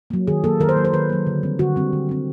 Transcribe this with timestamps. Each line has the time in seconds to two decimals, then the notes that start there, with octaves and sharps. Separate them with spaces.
0.10 F#3 A#3
0.27 D#3 G#4
0.44 F#3 A#3 A4
0.60 D#3 A#4
0.69 C5
0.76 F#3 A#3
0.85 C5
0.93 D#3 B4
1.10 F#3 A#3
1.27 D3
1.43 G3 C4
1.59 D3 F#4
1.76 G3 C4
1.93 D3
2.09 G3 C4